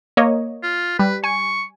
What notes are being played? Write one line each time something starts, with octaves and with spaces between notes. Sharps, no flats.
A#3 C#5 D#5
F4
G3 B4
G#5 C#6